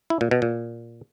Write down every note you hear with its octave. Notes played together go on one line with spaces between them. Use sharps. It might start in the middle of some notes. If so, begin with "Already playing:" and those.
E4
A#2
B2
A#2